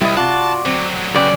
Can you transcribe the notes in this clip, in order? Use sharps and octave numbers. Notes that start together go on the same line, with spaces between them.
C2 G3 E4 D#5
C3 F4 F#4 D5 F#5 A5
D3 F#3 C4
C#3 F#4 B4 D5 G5